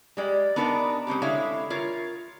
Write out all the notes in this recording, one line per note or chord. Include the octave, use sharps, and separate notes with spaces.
G3 G#3 D5
B3 D4 D#4 A#4 B4
G#3 C4 C#4 G4
D3 G#3 E4 C#5 F5
F4 A#4 C#5